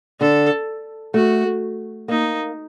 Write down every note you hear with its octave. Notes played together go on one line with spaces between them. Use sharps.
D3 A4
A3 F#4
A#3 D#4